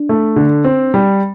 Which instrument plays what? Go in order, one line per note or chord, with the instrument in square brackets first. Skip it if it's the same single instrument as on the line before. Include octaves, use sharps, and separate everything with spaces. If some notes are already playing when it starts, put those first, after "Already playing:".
Already playing: [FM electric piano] D4
[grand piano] A3
D3
C4
G3